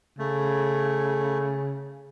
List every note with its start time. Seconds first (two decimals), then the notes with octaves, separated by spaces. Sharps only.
0.19 C#3 A3